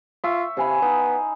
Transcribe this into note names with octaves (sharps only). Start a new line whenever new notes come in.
F4 E5 C#6
C3 F5 G#5 B5
B3 D#4